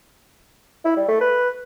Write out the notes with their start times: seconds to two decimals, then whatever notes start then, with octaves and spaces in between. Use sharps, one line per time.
0.85 E4
0.97 G3
1.08 A3
1.20 B4